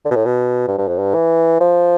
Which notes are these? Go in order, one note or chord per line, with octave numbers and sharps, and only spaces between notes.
D3
B2
A2
B2
G2
G2
F2
G2
E3
F3